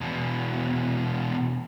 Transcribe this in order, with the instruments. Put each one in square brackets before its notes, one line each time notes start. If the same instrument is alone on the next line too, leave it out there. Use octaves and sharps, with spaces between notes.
[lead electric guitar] E2 B2